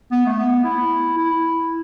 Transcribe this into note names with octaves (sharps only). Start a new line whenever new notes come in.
B3
A3
B3
E4
E4